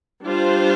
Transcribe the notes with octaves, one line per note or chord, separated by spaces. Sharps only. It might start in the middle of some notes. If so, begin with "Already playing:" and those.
G3 D4 F4 C5